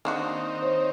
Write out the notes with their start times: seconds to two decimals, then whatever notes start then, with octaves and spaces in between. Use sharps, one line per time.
0.05 D#3 A#3 C4 D4 D#4 F#4
0.62 C5 C#5